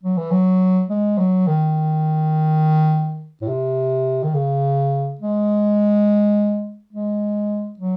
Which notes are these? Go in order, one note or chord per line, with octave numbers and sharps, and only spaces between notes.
F#3
E3
F#3
G#3
F#3
D#3
A2
C3
D#3
C#3
G#3
G#3
F#3